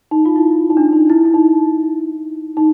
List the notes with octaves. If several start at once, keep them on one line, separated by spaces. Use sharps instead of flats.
D#4
F4
E4
D#4
D4
D#4
E4
E4
D#4
D#4